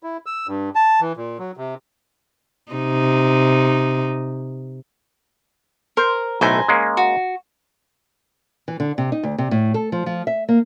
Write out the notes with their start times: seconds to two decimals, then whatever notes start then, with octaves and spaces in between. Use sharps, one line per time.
0.03 E4
0.26 E6
0.47 G2
0.75 A5
1.00 E3
1.17 A#2
1.39 F#3
1.57 C3
2.72 C3 D#4
5.97 A#4 C5
6.41 B1 A2 A3 C5 G#5 A#5
6.69 G#3 A#3 C#4
6.97 F#4
8.68 E3
8.80 D3
8.98 C3
9.12 D#4
9.23 D2
9.38 C3
9.51 A2
9.74 A4
9.92 F3
10.06 F3
10.27 E5
10.49 A#3